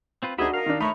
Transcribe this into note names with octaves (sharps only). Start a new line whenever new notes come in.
C4 F4 B4
D2 D4 D#4 F#4 G#4 D#5 E5 B5
D#4 A#4 F5
D#3 D4
A3 D#4 A#4 C#5 B5